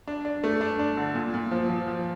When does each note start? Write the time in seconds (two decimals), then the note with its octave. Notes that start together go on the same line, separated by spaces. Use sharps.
0.07 D4
0.25 D4
0.44 A3
0.61 D4
0.79 D4
0.97 D3
1.15 A#2
1.34 A#2
1.51 F3
1.69 F3
1.87 F3